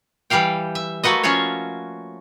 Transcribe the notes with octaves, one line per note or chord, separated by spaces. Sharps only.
E3 G3 G4 F5 G5
E5
A3 A#3 F#4 B4 D#5
F3 C#4 F4 F#4 C#5